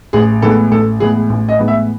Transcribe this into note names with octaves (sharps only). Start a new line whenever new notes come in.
A1 G#4
A2 E3 G#3 B3 A4
A1 A4
A2 E3 G#3 B3 G#4
A1
D#5
A2 E3 G#3 B3
E5